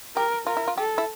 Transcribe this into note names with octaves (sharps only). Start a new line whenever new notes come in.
G4 A#4
F4 A#4
E4
F4
G4 A4
E4